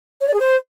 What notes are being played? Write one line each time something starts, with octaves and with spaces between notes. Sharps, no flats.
C#5
D5
G#4
C5